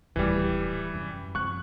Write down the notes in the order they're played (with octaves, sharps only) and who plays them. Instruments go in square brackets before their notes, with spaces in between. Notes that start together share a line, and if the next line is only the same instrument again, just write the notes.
[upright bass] D1 D#3 [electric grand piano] E3 G3
[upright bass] F#2
[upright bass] F3 C4 [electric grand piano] C#6 F#6